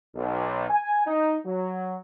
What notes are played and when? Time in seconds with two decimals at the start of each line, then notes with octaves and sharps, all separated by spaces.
0.15 B1
0.69 G#5
1.06 D#4
1.46 F#3